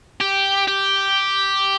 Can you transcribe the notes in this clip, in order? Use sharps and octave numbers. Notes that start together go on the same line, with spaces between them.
G4
G4